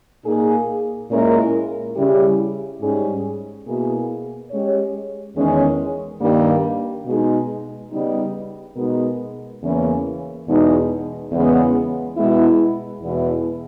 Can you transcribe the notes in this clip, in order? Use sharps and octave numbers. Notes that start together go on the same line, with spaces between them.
A#2 A#3 D#4 G#4
A#2 G#3 C#4 E4 A#4
C#3 G3 C#4 E4 G4
G#2 G3 C#4 G#4
B2 A#3 E4 G#4
G#3 C#4 G4 C#5
E2 D#3 G#3 C#4
G2 D#3 G3 A#3
B2 G#3 D#4 G#4
C#3 G3 B3 D#4
B2 G#3 B3 D#4 A#4
E2 C#3 E3 A#3 C#4
E2 B2 G#3 D#4
E2 C#3 G#3 B3
B2 G#3 B3 E4
E2 B2 G#3 B3 E4